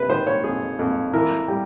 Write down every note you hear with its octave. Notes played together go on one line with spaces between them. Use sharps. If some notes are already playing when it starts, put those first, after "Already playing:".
Already playing: C3 B4
D#3 C5
C#5
F2 G#4
F2
E3 A#4
G3